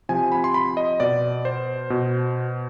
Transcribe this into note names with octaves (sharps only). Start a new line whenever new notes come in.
C3 F3 G#5
B5
C6
B5
D#5
B2 D5
C5
B2